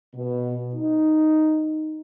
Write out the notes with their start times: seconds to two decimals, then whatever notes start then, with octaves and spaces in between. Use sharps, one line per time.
0.16 B2
0.75 D#4